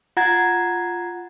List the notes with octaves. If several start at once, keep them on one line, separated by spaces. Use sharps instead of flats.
F4 F#5 A#5 G#6 A6